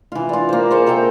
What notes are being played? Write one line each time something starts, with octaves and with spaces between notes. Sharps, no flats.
E3 F4
F4 D5
A#3 C5
G#4 C5 C#6 D6
A4 A#4 E5 G5